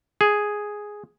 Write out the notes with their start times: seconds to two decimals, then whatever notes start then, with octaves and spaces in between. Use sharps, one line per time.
0.21 G#4